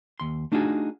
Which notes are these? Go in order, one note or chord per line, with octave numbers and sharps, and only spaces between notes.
D#2 C6
A3 D4 D#4 F4 F#4 G#4